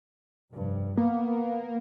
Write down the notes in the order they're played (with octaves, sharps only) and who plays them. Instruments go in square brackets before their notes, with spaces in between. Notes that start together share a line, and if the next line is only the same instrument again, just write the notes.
[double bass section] F1 G2
[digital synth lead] A#3 [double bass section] B3